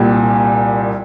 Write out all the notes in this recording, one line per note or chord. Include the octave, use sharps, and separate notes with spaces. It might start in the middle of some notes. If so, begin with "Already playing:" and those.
Already playing: C2 A#2 G3